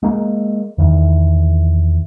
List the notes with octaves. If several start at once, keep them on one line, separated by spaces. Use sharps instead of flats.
G#3 A#3
E2 D#3 E3